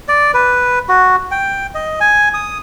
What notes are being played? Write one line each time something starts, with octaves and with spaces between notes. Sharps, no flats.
D5
B4
F#4
G5
D#5
G#5
D#6